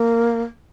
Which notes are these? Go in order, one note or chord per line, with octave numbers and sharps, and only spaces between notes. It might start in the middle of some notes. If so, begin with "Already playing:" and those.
Already playing: A#3